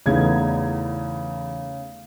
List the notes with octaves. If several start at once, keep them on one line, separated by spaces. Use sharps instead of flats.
E2 C#3 A3 B3 D#4 G#6